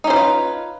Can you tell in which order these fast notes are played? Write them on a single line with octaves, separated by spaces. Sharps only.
D#4 C#4 C5 B4 F4